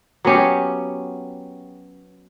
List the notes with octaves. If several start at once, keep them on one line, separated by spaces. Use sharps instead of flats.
F#3 B3 C#4 G4